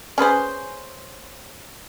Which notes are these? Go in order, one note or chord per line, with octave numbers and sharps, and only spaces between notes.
C#4 G#4 B4 C5